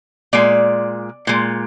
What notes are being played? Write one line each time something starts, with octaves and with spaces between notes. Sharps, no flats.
A#2 G#3 D5
A#2 G#3